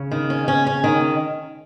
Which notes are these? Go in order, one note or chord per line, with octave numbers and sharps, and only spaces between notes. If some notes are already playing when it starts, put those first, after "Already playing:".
Already playing: C#3
D#3
C#4
C#4
C#4
D#3